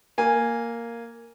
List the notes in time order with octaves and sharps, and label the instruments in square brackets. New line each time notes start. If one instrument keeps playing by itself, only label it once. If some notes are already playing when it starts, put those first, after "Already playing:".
[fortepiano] A#3 G#5